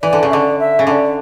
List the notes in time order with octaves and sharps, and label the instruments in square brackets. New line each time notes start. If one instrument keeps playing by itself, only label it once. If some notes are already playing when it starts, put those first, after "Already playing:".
[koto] E3 [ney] D5
[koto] D3
C#3
[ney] E5
[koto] D3 [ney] D5
[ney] E5
[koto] C#3
[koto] D3 [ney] E5
[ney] D5